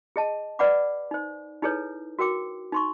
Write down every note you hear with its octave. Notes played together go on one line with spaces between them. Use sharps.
G#4 D#5 A5
B4 D5 F#5 B5 D6
D#4 C5
D#4 E4 G#4 A4 B4 C#5
F#4 A#4 G5 D6
D#4 C6 C#6